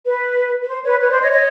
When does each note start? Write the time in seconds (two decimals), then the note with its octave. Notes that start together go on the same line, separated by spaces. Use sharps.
0.06 B4
0.62 B4
0.68 C5
0.84 B4 C#5
1.00 B4 C#5
1.10 C5 D5
1.21 C#5 D#5
1.32 C#5 D#5